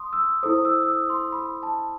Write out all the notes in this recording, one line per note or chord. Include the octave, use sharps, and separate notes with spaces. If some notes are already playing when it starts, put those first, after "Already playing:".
Already playing: C6 D#6
E6
E4 A4 C5 D#6
E6
E6
D#6
C6
B5
A5